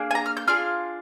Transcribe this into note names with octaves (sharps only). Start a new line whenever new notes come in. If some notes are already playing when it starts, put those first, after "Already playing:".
Already playing: A#3 D4 G#4
G#5
A#5
F6
G6
D4 F4 G#4 F6